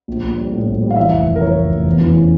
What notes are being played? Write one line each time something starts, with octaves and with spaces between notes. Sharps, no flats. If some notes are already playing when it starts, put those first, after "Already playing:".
A#1
A#1
G3
A2
A#1
G3
F5
E3 E5
F1
F2
A#4
E3 C#5
F1
F1
E2
E3
C#4